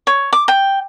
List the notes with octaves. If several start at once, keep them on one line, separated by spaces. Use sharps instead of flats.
C#5
D6
G5